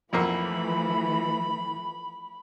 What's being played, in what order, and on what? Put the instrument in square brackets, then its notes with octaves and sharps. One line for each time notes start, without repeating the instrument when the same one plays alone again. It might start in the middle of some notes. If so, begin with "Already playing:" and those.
[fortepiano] B1 F2 A#3 [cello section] E3 F3 A3 [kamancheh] B5